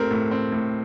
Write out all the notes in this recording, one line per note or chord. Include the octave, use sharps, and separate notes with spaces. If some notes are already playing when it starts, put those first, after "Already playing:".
Already playing: A2 A3 C4 G4 A#4
A2
C4
A2